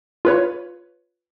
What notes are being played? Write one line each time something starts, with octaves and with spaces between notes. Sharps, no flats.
F4 B4 C#5